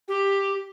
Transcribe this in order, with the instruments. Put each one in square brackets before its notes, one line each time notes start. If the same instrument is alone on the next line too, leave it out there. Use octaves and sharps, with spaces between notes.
[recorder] G4